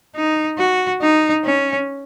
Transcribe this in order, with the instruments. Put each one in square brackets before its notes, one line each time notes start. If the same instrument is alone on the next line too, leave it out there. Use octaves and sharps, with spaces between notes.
[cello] D#4
F#4
D#4
C#4